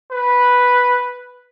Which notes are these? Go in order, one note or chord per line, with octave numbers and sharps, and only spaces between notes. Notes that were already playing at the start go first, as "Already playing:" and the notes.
B4